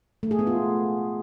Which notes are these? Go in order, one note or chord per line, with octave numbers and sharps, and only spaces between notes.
A3
G#4
B3
F4